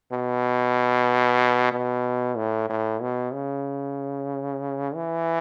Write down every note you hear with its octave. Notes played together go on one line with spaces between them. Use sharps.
B2
B2
A2
A2
B2
C#3
E3